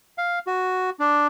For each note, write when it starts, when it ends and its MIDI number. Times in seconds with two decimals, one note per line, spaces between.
0.18 0.39 77
0.47 0.90 66
0.99 1.27 62